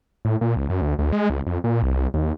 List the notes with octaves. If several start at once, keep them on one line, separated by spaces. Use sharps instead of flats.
A2
A#2
C#2
F#2
D2
D2
G#3
C#2
F2
A#2
C2
D#2